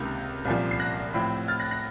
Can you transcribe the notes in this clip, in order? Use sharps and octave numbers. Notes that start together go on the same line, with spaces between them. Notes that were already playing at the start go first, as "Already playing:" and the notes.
Already playing: C#2 C3 D#3 A#3 F#6
C2 A#2 F3
C7
F#6 A#6
A2 F3 C4
F6 A6
F#6 A#6
F#6 A#6